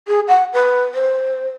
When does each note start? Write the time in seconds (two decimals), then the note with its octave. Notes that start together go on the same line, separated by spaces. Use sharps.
0.08 G#4
0.28 F#5
0.53 B4
0.94 C5